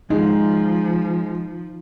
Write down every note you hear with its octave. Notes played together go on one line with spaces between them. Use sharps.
F3 G#3 D#4